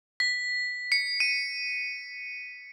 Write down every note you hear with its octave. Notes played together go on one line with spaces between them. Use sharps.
B6
C#7
D#7